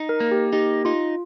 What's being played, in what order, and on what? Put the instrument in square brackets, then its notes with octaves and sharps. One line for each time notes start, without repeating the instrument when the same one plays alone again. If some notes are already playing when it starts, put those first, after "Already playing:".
Already playing: [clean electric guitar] D#4
[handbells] A#4
[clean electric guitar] A#3
[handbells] G4
[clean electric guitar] D#4 [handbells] G4
[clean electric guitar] D#4 [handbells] F4